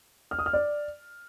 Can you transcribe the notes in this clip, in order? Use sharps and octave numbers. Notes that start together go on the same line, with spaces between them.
F6
D#6
F6
D5